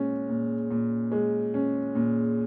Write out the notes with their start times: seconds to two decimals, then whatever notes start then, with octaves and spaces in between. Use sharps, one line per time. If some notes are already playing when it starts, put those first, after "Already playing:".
Already playing: A#2 G#3 C#4
0.29 A#2
0.71 A#2
1.12 G#3
1.54 C#4
1.95 A#2